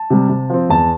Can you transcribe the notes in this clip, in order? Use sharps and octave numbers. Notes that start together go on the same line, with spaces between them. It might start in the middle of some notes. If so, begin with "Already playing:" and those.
Already playing: A5
C3 G3
C3
F3 C4
E2 A5